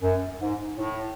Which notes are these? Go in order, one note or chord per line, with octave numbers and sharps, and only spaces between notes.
F#2
G#2
A2